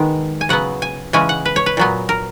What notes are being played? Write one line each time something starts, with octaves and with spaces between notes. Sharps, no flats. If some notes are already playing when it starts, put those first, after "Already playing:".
Already playing: D#3 G#3 B3
G#5
C#3 F#3 B3 F#5
G#5
C#3 E3 G#3 C#4 G#5
F#5
B4
C#5
B4
A#2 F#3 B3
A#4